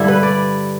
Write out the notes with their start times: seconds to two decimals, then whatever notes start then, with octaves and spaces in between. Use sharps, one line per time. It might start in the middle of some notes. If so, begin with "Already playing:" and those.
Already playing: G2 D3 G3 E4
0.08 B4
0.23 D5